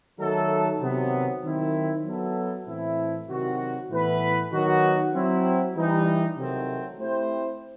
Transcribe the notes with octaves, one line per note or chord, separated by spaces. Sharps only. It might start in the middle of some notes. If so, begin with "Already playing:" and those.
D#3 F#3 A3 D#4 A4
C3 D#3 F#3 B3
D#3 F#3 C4 E4
F#3 B3 E4 A4
A2 E3 A3 C4 E4
C3 D#3 F#3 C4 F#4
A2 E3 B3 E4 B4
D#3 F#3 B3 D#4 F#4
F#3 C4 E4
E3 G3 D#4
C3 D#3 F#3 A3 C4
A3 C4 E4 G4 C5